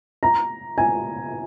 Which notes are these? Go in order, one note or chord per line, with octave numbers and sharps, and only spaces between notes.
A#5
G#5